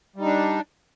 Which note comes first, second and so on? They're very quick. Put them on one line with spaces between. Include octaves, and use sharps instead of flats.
G3 D#4 D4